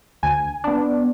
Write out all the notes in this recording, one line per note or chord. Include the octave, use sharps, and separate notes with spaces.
D2 G#5
B3 D4